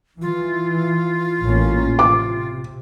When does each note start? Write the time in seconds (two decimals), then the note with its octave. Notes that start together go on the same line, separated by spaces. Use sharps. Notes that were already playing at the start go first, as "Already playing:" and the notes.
0.22 E3 F4
1.43 A1 A#3 C#4
1.99 C3 D6